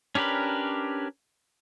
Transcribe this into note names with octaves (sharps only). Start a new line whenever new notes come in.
C#4 D4 G4 A#4 B4